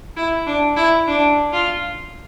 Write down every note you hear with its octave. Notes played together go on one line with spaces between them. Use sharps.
E4
D4
E4
D4
F4